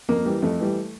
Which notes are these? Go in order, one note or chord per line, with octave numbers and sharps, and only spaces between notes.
F2 A#3
E3 G3
F2 A3
E3 G3